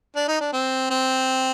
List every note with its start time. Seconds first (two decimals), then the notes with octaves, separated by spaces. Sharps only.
0.16 D4
0.28 D#4
0.40 D4
0.53 C4
0.90 C4